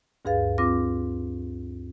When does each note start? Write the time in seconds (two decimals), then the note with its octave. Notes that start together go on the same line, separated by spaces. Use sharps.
0.25 D2 G2 G#4 B4 F5 A6
0.58 C4 F4 D6 A#6